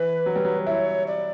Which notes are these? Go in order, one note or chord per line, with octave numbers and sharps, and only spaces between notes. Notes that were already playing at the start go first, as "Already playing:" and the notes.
Already playing: E3 B4
F#3
G3
F#3
E4 C#5
D5